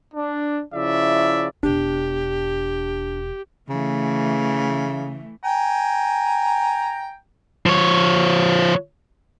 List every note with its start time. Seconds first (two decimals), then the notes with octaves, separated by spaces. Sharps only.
0.15 D4
0.74 C#3 F3 E4 D5 E5
1.63 E1 B3 D4 G4
3.69 C#3 E3 A3
5.44 G5 G#5 A#5
7.66 F3 C#5